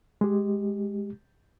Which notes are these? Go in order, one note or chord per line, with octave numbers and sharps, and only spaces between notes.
G#3 G4